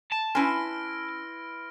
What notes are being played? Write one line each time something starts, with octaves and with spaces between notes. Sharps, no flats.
A5
C#4 E4 B4 G#5 C6 F6 A#6 D7